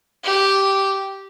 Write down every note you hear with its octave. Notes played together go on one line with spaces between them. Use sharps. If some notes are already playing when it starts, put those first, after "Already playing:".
G4